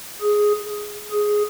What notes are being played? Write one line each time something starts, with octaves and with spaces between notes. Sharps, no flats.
G#4
G#4